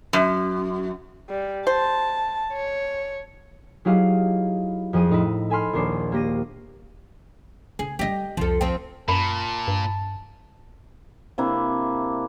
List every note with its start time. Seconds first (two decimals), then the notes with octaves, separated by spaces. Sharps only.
0.13 F#2
1.29 G3
1.67 C5 A5
2.53 C#5
3.85 F#3 D#4 E4 G4 G#4 F5
4.93 F2 F3 G#4 D#7
5.09 A2 D#4 E4
5.50 A4 G#5 B5 C6 F6
5.73 A#1 D#2 D4 C7
6.12 A#3 G4 A#6 D#7
7.79 C#3 G#4
7.99 G3 G#3 G4 D#5
8.37 C2 F2 F3 A4
8.61 F3 C4
9.08 F#2 A#2 A5 B5
9.68 G2
11.38 C3 A#3 D4 E4